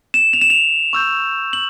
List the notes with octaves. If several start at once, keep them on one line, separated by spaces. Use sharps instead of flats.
E7
F7
E7
F7
C#6 E6 G6
F#7